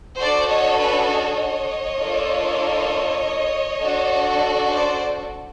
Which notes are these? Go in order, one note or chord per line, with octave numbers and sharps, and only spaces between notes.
D4 F#4 A4 C5 D5
C#5 D#5
B4 C#5
C#5 D#5
A#3 D4 F4 A4
D4 F#4 A4
C5 D5